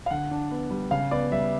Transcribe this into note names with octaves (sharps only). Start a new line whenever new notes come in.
F5
D3 F#5
D4
B3
G3
C#3 F5
B3 D5
G3 E5